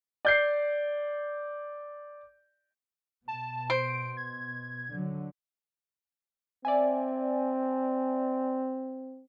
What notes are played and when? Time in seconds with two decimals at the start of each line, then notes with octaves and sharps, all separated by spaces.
0.25 D5 G6 C7
3.28 B2 A5
3.70 C5 D7
4.17 G#6
4.95 D3 F#3
6.65 C4 D5 E5 G#5